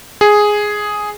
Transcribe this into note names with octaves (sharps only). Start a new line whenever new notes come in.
G#4